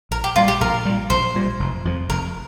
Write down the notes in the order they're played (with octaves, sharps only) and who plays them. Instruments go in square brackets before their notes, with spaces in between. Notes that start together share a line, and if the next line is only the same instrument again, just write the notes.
[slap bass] A#1 [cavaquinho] A#4
[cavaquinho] G4
[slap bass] A#2 G3 [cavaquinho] F4
[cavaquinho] G4
[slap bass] A#1 [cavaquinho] A#4
[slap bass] A#2 G3
[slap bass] A#1 [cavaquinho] C5
[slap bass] A#2 G3
F1
F2 F3
[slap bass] F1 [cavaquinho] A#4